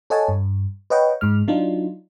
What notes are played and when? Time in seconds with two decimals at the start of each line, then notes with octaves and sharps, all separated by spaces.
0.10 A4 C#5 D#5 F#5 G#5 A5
0.28 G2
0.90 B4 C#5 D#5 F#5 G5
1.21 G#2 G#3 F6
1.48 F#3 D4 D#4 F4